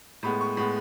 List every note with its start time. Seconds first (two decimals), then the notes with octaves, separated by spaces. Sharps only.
0.23 A2 G#3 B3 B5
0.41 C#6
0.57 A2 G#3 B3